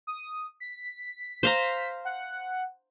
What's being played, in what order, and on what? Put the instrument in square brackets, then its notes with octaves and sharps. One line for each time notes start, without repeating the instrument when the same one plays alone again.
[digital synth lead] D#6
B6
[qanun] C5 F5 A#5
[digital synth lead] F#5